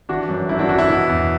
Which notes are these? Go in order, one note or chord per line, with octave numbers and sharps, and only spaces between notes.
E3 D4 F#4
F#2
F#2 E4
D4 F#4
E3 D4 F#4
E4
B2
E2